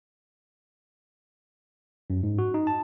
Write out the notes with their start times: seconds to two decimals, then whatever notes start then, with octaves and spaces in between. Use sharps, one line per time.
2.10 F#2
2.23 G#2
2.39 F#4
2.54 D#4
2.67 A5